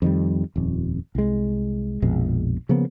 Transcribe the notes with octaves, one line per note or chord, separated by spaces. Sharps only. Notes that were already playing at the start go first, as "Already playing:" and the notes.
F2 D#3 G3
D#1 F2
C2 G#3
A#1 F2 B2 G#3
C#3 F3 A#3 B3